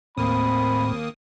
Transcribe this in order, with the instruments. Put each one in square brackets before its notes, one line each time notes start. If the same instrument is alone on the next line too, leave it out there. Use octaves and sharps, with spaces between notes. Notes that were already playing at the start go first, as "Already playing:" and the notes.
[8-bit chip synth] D#2 A#3 D#6 [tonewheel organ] A2 [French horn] C4 [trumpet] B5